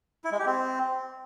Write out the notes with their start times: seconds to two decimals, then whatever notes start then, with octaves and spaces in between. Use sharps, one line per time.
0.24 E4
0.32 G#3
0.39 G4
0.46 C4